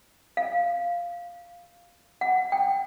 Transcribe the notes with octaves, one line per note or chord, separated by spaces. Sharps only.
F5
F#5
G5